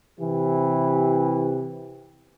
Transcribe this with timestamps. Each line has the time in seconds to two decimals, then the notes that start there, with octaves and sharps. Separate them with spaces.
0.20 C3 E3 G4